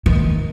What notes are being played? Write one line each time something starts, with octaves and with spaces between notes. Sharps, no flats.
D#3